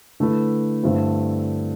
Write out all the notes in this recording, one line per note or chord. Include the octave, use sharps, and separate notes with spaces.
D3 A3 E4 B4
G2 D3 A3 C4 E4